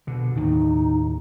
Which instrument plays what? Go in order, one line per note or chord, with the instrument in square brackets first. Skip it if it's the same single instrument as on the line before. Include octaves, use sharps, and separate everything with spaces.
[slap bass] B2 D3
[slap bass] D#2 A2 [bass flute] D#4